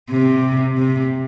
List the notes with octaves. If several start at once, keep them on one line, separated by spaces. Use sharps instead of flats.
C3
C3